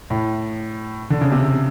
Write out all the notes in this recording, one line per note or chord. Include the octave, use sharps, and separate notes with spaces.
A2
D3
C#3
C3